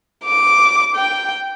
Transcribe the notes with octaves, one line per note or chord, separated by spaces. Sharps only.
D6
G5